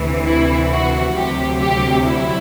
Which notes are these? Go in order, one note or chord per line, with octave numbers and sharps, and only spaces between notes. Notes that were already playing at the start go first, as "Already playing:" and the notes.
Already playing: D2 C3 E3
E4
F#4
D2 C3 F#3 G4
G4
E4